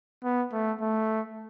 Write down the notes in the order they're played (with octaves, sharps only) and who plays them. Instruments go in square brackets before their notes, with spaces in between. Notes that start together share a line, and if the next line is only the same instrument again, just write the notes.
[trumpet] B3
A3
A3